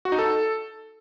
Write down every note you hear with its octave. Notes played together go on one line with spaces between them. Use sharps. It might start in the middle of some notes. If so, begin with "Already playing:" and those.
F#4
D#4
A4